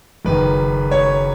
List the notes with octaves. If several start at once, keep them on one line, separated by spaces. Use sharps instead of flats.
F#1 F#2 D#3 B4
C#5